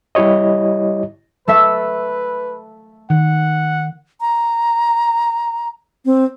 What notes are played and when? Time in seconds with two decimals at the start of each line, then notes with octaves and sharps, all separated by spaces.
0.15 G3 E4 G4 C#5 D#5
1.48 A3 A4 B4 E5
3.10 D#3 F#5
4.21 A#5
6.05 C4